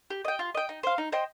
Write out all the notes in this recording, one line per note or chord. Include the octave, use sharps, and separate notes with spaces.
G4
D#5 G5
F4
D#5 G5
D#4
C5 F5
D#4
C5 D#5 G5